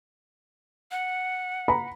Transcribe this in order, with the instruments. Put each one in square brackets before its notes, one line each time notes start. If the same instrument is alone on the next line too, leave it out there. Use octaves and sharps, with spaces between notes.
[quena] F#5
[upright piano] A#5 B5